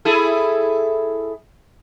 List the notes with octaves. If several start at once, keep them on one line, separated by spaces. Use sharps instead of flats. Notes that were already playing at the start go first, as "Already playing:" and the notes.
E4 G#4 A4